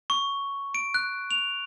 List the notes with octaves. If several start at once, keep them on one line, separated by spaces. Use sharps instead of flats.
C#6
D7
F#6
F7